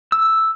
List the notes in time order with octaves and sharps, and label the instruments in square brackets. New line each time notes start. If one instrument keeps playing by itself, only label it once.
[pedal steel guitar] E6